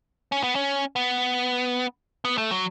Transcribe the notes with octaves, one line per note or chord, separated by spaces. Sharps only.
C#4
B3
C#4
B3
B3
A3
F#3